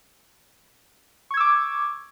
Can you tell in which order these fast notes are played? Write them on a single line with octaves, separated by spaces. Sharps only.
C#6 G#6 E6 D6